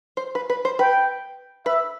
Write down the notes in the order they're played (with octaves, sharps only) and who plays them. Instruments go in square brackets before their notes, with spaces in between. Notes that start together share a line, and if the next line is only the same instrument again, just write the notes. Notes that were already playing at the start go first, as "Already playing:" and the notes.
[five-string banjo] C5
B4
B4
C5
[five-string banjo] B4 [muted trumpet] G5
[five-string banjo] B4 [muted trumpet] E5